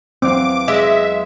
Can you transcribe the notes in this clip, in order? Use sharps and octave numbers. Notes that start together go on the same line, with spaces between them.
E2 F#3 C4 F5 D6
G#3 E5